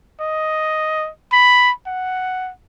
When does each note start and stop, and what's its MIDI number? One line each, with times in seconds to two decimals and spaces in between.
0.21 1.10 75
1.32 1.72 83
1.87 2.51 78